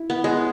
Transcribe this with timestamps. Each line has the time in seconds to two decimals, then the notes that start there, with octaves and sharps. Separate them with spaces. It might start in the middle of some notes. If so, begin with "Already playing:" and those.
Already playing: E4
0.10 B3
0.24 G#3